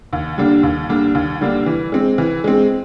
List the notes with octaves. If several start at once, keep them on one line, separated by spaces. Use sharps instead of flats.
D#2
D3 G3 A#3 D4
D#2
D3 G3 A#3 D4
D#2
D3 G3 A#3 D4
E3
G#3 C4
E3
G#3 C4